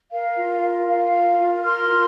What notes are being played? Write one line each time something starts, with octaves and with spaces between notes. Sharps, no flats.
A#4 F5
F4
A#4
F4 F5
A#4
F4
A#4 C6 F6
F4